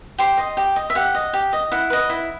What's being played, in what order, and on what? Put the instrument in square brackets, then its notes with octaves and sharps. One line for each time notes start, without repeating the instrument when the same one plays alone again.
[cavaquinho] G4 C6
D#5
G4
D#5
E5
G4 F#5
D#5
G4
D#5
E4 F#5
B4 D#5
E4